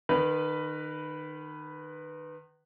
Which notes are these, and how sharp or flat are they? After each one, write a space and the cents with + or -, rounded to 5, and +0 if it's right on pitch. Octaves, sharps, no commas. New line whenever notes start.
D#3 -30 B4 +0